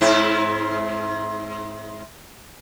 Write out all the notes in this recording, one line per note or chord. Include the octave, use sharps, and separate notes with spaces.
G#2 C4 E4